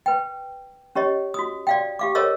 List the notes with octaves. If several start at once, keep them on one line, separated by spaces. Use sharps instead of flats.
B4 G5
C#4 G4 C#5 D#5
F#4 D#6
D5 F5 G5
G4 F5 D6
A4 A#4 C5 C#5 D#5 E6